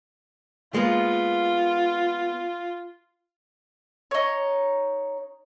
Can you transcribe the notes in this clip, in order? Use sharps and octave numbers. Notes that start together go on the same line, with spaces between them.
G#3 A#3 B3 F4
D#4 C#5